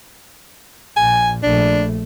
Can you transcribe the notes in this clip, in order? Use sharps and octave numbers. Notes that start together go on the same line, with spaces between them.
A#1 A#2 G#5
A#1 A3 D4